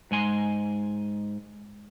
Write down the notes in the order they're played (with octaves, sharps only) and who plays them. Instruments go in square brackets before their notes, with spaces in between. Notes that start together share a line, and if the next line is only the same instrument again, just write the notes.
[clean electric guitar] G#2 G#3 G#5 C6